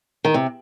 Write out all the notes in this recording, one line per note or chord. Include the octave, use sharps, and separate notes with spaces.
D#3
C3